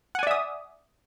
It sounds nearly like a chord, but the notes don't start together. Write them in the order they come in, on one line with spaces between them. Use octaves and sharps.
F#5 G#5 D5 E5 D#6